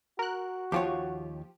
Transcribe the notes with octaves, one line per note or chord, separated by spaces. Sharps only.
F#4 A#4 F#6
D#2 F3 F4 G4 C#5